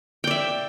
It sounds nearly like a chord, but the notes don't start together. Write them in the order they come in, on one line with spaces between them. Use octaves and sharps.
G5 D5 E5